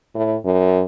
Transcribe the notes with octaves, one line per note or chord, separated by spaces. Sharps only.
A2
F#2